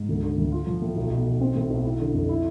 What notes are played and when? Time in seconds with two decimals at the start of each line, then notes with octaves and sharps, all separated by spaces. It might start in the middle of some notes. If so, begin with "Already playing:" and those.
Already playing: G#2
0.09 D2
0.23 D3
0.38 D2
0.52 F4
0.67 F3
0.82 A2
0.96 B1
1.11 B2
1.26 B1
1.41 C4
1.55 A2
1.70 B1
1.84 E4
2.00 D3
2.14 F2
2.29 E4